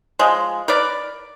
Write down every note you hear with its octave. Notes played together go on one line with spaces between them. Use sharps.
F3 G#3
A#4 B4 D5